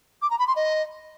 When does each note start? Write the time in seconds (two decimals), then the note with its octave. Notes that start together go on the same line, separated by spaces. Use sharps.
0.22 D6
0.30 A#5
0.39 B5
0.47 C6
0.56 D#5